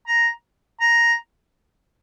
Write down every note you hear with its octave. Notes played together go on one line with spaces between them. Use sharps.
A#5
A#5